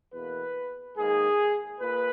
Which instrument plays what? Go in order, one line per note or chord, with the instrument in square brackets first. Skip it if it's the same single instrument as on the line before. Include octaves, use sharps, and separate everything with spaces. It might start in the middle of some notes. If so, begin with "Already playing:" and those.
[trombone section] E2 B2 A#3 B4
G#2 D#3 A#3 G#4
A#2 B4